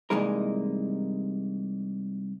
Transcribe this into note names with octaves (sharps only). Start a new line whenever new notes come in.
C2 E3 G#3 A#3 D#4 A#4